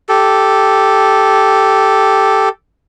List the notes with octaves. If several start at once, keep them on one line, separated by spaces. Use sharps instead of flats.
G4 A4